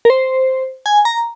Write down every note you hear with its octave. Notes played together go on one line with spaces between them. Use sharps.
A#4
C5
G#5
A#5